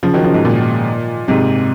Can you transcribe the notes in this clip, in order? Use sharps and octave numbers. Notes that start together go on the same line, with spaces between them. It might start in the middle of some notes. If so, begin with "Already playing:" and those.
C#3 F3
D#3 F#3
C#3 F3
G#2
A#2
G#2 C3